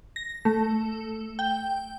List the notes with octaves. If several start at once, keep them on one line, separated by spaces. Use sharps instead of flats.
A#6
A3
G5